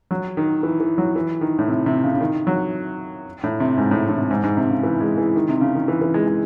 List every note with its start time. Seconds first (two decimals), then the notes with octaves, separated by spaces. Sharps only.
0.11 F#3
0.37 D#3
0.63 E3
0.80 E3
0.98 F#3
1.16 E3
1.41 D#3
1.58 A2
1.68 C3
1.86 C3
2.04 C#3
2.14 C#3
2.21 D#3
2.47 F#3
3.43 A2
3.60 C3
3.77 G#2
3.91 A2
4.09 A2
4.18 C3
4.31 G#2
4.43 G#2
4.57 C3
4.70 C#3
4.83 E3
5.01 G#3
5.18 E3
5.36 D#3
5.49 C3
5.61 C#3
5.75 D#3
5.88 E3
6.01 E3
6.14 G#3
6.27 G#3